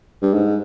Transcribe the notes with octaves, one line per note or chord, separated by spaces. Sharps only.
G2
G#2